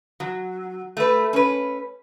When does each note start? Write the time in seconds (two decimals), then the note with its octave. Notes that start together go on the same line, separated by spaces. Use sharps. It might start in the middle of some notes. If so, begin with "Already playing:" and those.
0.20 F#3
0.97 A3 B4
1.33 C#4 B4